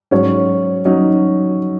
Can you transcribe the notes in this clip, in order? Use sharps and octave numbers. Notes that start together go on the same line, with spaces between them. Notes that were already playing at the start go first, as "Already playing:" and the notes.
G#2 F#3 C#4 C#5
F#3 C#4 D#4